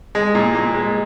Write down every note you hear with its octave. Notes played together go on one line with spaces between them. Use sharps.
G#3
A#2
A#2
G#3